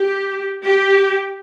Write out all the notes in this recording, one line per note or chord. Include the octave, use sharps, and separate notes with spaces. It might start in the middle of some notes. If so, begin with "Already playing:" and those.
Already playing: G4
G4